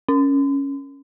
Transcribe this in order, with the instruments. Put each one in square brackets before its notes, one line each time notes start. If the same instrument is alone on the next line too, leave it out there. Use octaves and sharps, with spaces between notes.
[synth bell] C#4